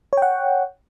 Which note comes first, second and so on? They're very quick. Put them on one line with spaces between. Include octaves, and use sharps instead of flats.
C#5 G5 F#5